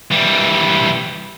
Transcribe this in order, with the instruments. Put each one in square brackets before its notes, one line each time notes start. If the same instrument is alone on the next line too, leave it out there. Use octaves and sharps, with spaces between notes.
[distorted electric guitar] E3 G3